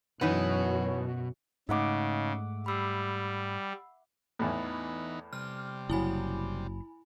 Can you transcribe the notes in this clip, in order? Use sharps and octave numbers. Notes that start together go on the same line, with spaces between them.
F#2 B2 E3 D#4 F#4 B4 C#5 F#5
G#2 C#3 A3 D#4 D#5 E5 F#5 D6
G3 B5 E6 C7
E2 A2 E3 B3 D#4
C3 G3 F6
F#1 F#3 E4 G#5 B5